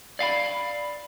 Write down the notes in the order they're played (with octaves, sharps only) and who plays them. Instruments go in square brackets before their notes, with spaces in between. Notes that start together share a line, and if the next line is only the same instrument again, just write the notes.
[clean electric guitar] D5 F5 F#5 B5